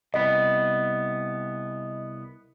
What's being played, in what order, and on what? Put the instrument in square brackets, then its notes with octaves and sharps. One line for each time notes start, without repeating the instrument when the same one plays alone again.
[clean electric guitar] C2 B3 [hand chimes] D#5